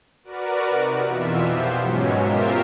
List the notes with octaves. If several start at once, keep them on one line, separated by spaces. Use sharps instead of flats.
F#4 A#4 B4 D5
C3 D#4
F2 B2 E3 F4 E5
F3 B3 G4 C5
G#2 B2 F#3 G#3 C#4
F4 G4 A#4 C5 E5